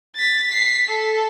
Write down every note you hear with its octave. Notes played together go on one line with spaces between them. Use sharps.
A6 B6
B6 C7
A4